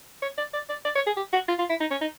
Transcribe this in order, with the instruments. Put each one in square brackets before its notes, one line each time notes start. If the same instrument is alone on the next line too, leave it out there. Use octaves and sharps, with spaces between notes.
[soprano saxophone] C#5
D5
D5
D5
D5
C#5
G#4
G4
F#4
F4
F4
E4
D#4
C#4
D#4